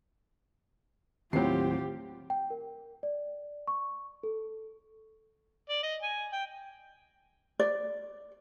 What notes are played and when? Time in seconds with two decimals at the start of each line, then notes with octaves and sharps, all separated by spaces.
1.33 D#2 A2 F#3 C4 F4 G4 C7
2.30 G5
2.50 A#4
3.03 D5
3.67 C#6
4.23 A4
5.69 D5
5.83 D#5
6.02 G#5
6.33 G5
7.59 D5